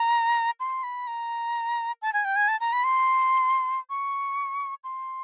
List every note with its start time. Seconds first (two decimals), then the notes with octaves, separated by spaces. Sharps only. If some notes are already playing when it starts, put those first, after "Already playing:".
Already playing: A#5
0.60 C6
0.83 B5
1.07 A#5
2.02 A5
2.13 G#5
2.25 G5
2.36 G#5
2.48 A5
2.60 A#5
2.73 B5
2.84 C6
3.90 C#6
4.84 C6